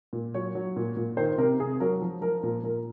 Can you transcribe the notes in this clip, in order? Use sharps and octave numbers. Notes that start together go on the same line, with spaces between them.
A#2
F#3 C#5
F#3
A#2
A#2
D#3 C5
C3 A#4
C3 G#4
F#3 A#4
F3
F3 A#4
A#2 A#4
A#2 A#4